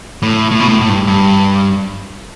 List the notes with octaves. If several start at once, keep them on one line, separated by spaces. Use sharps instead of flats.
A2
A2
B2
A2
A2
G2
G2